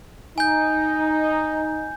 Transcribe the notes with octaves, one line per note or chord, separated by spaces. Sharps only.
D#4 G#5 G6